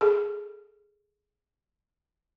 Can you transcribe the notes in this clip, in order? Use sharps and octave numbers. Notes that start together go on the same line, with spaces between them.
G#4 A4